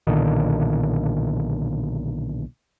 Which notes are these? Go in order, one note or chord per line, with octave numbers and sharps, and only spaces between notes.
B1 A#2 D3 D#3